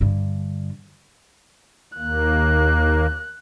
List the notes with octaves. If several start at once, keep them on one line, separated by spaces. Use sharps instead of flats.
G2 D3
D#2 A#3 F#6